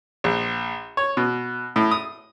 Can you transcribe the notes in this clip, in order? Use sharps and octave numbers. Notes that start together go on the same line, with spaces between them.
A#1
C#5
B2
A2
D#6